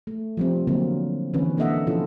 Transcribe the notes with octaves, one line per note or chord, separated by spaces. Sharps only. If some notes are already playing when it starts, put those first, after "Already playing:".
A3
F3 G3 C4
D3 F#3 A#3 C4
D3 E3 A#3 C4 C#4 B4
A#3 D4 A4 D#5 E5 F#5
B2 F3 C#4 E4 F4 A4